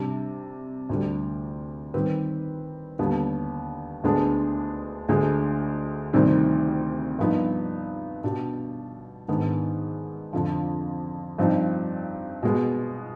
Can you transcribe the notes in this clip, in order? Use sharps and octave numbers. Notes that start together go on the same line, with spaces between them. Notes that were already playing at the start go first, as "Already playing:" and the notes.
Already playing: C3 G3 D4
D2 D3 G3
D#3 G3 C4 G4 B4
D#2 D3 G3 B3 D4
D2 D3 G#3 B3 D4
D2 D3 G#3
D2 C3 D#3 G3 C4
G2 F3 B3 D#4
B2 B3 D4 G4
G#2 D#3 B3 D4
F2 D3 F3
G2 F3 C4 D#4
B2 G#3 B3